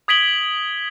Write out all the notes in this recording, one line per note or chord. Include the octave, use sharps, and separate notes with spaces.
D#6 G#6 B6 D7 F#7 G7